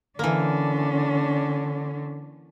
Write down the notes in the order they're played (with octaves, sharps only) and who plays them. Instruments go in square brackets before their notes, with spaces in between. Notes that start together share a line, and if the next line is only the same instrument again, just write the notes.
[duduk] D3 [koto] E3 A#3 [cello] C#4 D4